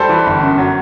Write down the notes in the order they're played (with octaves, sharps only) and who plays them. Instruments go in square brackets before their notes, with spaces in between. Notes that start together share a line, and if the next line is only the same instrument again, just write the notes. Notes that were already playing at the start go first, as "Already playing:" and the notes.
Already playing: [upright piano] G3 A4 C5
E3
G1
F#2
F#3